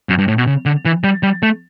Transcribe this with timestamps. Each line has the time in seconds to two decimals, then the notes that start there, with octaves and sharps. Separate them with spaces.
0.09 F#2
0.19 G2
0.28 A2
0.38 B2
0.47 C#3
0.66 D3
0.85 E3
1.04 G3
1.23 G3
1.43 A3